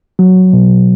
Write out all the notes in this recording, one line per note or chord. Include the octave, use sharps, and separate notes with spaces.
F#3
B2